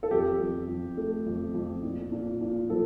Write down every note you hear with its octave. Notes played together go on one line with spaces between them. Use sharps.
A4
F2 G4
F2
F2
A3
F2
F2
A#2
A#2
A#2
F3 A4